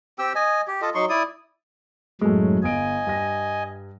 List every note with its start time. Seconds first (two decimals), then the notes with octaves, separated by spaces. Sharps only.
0.19 C4 G4 G5 E6
0.35 D#5 G#5
0.68 G4
0.82 F4 A4 D#5
0.95 F#3 D#4 C6 C#6
1.09 E4 D5 D#6
2.21 F#2 A2 F#3 G#3 A3
2.63 G1 D#5 G#5 D7
3.07 G2 A#6